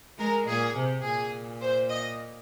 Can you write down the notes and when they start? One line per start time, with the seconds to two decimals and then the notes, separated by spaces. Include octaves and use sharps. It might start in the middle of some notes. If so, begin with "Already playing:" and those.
0.18 G#3 A#4
0.47 A#2 G#4
0.75 C3
1.03 A#2 G#4
1.60 C5
1.89 D#5